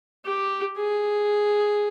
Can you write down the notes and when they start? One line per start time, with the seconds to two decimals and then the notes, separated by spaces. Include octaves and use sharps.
0.25 G4
0.77 G#4